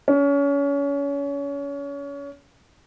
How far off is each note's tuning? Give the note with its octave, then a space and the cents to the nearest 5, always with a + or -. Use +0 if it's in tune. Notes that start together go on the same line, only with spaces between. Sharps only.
C#4 +30